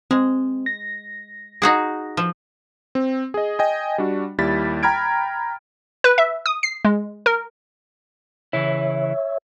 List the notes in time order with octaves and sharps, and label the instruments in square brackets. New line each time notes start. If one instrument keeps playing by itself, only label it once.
[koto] G#3 [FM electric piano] C4
[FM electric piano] A#6
[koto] D#4 F#4 G#4
F3
[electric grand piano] C4
G#4 D#5
D#5 G5 G#5
G3 D4 F#4
D#2 G3 E4 A6 B6
G5 A#5 B5 F6 G#6 D7
[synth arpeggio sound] B4
E5
D#6
C7
G#3
A#4
[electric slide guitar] C#3 E3 E4 [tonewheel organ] C#5 E5